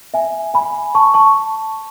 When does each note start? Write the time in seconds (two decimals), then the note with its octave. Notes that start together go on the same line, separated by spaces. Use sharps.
0.14 E5 G#5
0.54 G#5 B5
0.95 A5 C#6
1.14 A5 C#6